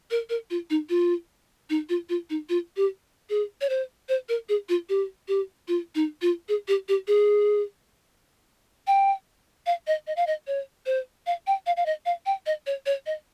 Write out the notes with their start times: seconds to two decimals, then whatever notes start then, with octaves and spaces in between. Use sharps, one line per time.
0.11 A#4
0.30 A#4
0.50 F4
0.70 D#4
0.89 F4
1.70 D#4
1.89 F4
2.09 F4
2.30 D#4
2.49 F4
2.77 G4
3.30 G#4
3.61 C#5
3.69 C5
4.09 C5
4.29 A#4
4.49 G#4
4.69 F4
4.89 G4
5.28 G4
5.68 F4
5.95 D#4
6.22 F4
6.49 G#4
6.68 G4
6.89 G4
7.07 G#4
8.87 G5
9.66 F5
9.87 D#5
10.07 D#5
10.17 F5
10.27 D#5
10.47 C#5
10.86 C5
11.26 F5
11.47 G5
11.66 F5
11.77 F5
11.86 D#5
12.06 F5
12.26 G5
12.46 D#5
12.67 C#5
12.86 C#5
13.06 D#5